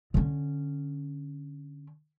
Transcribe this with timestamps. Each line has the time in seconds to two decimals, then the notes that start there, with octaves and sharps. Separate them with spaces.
0.14 D3 C#4